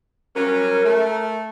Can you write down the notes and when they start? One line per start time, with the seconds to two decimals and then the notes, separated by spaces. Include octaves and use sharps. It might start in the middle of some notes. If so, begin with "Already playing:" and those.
0.35 F#3 G3 C#4 A#4
0.84 A3